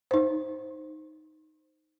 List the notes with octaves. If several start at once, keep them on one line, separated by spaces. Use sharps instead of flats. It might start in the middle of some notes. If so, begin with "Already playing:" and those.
D#4 C5